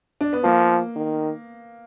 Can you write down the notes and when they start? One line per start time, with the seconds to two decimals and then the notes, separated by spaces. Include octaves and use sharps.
0.21 D4
0.33 B3
0.44 F3 A#3
0.96 D#3